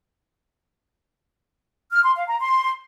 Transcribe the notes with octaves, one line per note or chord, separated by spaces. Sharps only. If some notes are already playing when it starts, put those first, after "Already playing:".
F6
C6
F5
A#5
C6